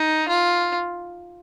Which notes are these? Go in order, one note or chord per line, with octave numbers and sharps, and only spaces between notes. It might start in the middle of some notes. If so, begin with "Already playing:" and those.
Already playing: D#4
F4